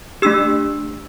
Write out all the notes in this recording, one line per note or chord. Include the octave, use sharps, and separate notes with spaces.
A3 D4 G4 E6